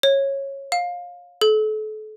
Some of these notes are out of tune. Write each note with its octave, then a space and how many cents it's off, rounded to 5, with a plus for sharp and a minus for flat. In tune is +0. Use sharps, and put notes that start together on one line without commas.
C#5 -15
F5 +20
A4 -35